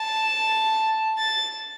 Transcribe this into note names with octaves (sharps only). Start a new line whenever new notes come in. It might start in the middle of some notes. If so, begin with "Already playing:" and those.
Already playing: A5
A6